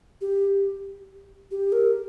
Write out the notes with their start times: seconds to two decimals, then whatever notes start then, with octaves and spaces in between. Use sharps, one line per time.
0.21 G4
1.51 G4
1.72 A#4